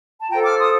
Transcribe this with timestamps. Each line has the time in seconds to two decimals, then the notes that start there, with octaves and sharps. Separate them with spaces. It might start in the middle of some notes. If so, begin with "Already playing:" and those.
0.21 A5
0.30 F4 A4 C5 G5 A#5
0.45 D6 F6
0.59 C6 D#6